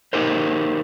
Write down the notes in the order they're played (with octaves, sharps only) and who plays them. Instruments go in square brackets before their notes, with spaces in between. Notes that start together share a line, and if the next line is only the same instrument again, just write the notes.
[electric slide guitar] D#4 G4 A#4 C5